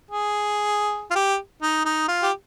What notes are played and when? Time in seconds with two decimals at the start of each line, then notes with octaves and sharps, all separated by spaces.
0.11 G#4
1.11 F4
1.15 G4
1.62 D#4
1.85 D#4
2.08 F4
2.23 G4